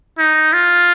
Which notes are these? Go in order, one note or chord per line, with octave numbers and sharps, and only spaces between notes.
D#4
F4